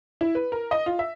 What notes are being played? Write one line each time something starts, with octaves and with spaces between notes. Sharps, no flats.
E4
B4
A#4
D#5
F4
E5